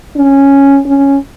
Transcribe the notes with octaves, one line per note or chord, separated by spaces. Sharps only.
C#4
C#4